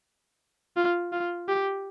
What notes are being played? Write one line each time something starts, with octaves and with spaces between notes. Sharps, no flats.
F4
F4
G4